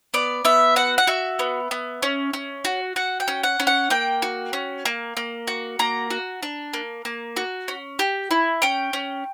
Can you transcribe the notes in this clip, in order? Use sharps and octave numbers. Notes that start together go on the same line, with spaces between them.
B3 D5
B3 E5
F#4 F#5
F#5
F#4 E5
B3
B3
C#4
C#4
F#4
F#4 F#5
G5
C#4
F#5
C#4
F#5
A#3 G5
F#4
C#4
A#3
A#3
F#4
A#3 A#5
F#4
D4
A#3
A#3
F#4
C#4
G4
E4
C#4 G5
C#4